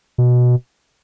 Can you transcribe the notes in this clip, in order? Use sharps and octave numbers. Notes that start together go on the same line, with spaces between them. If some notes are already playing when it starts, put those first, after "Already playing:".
B2